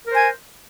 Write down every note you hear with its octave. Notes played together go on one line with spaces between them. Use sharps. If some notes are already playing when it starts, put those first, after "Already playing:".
A#4 C5 G#5